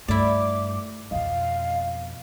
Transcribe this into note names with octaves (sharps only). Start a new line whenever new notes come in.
G2 A3 E4 D5 D6
F2 B2 D#5 F5